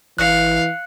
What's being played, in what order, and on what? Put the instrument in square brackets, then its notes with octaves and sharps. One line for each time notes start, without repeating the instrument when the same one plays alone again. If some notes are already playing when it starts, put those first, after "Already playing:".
[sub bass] A1 [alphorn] E3 [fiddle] F5 [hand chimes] F#6 C#7